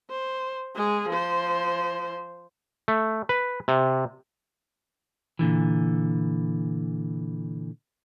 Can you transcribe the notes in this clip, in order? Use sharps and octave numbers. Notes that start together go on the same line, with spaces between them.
C5
G#3 G#4
F3 C5
A3
B4
C3
A#2 D3 E3